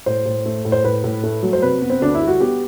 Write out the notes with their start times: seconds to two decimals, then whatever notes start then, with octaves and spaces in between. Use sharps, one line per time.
0.06 A2 C5
0.26 A2
0.46 A3
0.65 A2
0.72 C5
0.84 A2 B4
1.04 A2
1.24 A3
1.43 F#3
1.53 C5
1.62 C3 B4
1.82 B3
1.90 C4
2.01 D2 D4
2.15 E4
2.21 G3
2.28 F#4
2.40 B3 G4